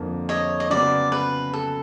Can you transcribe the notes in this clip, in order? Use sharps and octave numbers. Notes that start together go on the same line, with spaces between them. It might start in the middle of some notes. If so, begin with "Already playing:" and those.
Already playing: F2 D3 F3 A#3
C#5 D#5
D#5
C#3 F#3 B3 D5
B4
A4